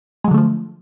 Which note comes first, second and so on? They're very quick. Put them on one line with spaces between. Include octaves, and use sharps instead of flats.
G#3 F#3 D3 A3 F3